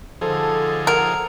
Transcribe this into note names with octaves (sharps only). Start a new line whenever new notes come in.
D3 F3 D#4 G#4 A4 C5 A5
A#4 F#5